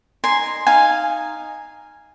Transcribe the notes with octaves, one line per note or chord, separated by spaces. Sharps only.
D#4 G#5 C6
D#4 F5 G#5